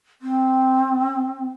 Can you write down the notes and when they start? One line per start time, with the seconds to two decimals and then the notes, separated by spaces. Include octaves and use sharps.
0.22 C4